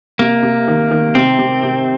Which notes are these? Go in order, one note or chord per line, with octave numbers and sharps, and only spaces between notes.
C3 A#3
C3
D#3
D#3
C3 C4
C3
C3